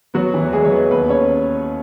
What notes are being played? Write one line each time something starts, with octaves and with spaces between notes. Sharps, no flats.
F#3 B3 F#4
E3 E4
E2
G#3 G#4
F#3 C#5
B3 B4
D#2 B3 B4
C#4 C#5